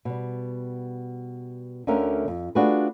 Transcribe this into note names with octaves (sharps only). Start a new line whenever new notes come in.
B2 G3
D2 D3 A3 C#4 A#4 F5
F2
A3 D4 F4 F#4 G#4 B4